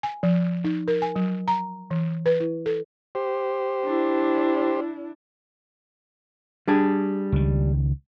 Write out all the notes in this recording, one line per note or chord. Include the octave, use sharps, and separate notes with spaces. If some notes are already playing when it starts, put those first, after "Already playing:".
G#5
F3
D#4
A#4
G#5
F#3
A#5
E3
B4
E4
A4
G4 C5
D4 E4
G3 D4 G#4
C#2 D#3